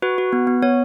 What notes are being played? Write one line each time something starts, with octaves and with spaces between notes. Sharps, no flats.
F#4 B4
F#4
B3
B3
B3 C#5